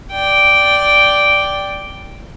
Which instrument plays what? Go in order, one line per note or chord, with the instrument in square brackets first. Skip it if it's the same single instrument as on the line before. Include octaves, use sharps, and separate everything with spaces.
[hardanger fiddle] D5 G5